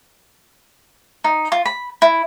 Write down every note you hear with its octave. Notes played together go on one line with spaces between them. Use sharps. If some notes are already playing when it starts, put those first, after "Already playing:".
D#4
F4
B5
E4